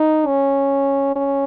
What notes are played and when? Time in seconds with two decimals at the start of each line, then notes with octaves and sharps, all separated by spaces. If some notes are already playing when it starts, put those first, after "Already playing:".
Already playing: D#4
0.27 C#4
1.16 C#4